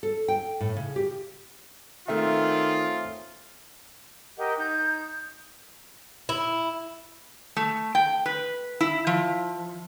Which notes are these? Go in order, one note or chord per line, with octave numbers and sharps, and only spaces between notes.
A4
G5
A2
C#3
G4
D#3 A3 C4 C#4 F4 E5
G4 A#4 D#5 F#5
D#4 G6
E4
A3
G5
B4
E4
F3